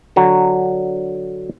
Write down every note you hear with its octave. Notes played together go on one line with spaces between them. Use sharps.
D3 F#3